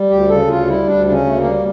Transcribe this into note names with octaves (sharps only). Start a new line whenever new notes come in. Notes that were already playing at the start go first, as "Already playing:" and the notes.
Already playing: G3
D2 G4
C#3 A4
D2 F4
G3 E4
D2 D4
C#3 D4
C#4
D2 A3
A#3
G3